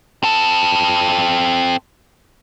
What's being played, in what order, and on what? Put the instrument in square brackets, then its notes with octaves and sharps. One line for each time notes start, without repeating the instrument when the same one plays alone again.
[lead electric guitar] C4 A4